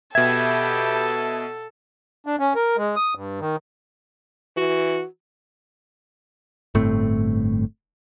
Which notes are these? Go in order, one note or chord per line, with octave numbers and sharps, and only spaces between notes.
B2 G4 A4 E5 G5 B5 G#6
D4
C#4
A#4
G#3
D#6
G2
D#3
E3 F#4
G1 A2 A3 C4